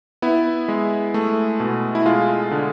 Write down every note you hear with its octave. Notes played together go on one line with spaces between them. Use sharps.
B3 E4
G#3
A3
B2
E4
G#3 F4
D3